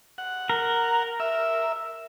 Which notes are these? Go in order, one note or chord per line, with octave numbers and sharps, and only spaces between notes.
F#5
A#4
E5